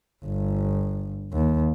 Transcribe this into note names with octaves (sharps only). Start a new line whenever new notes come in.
G1
D#2